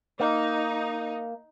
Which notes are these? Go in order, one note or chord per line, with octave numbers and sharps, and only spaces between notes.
A#3 D#4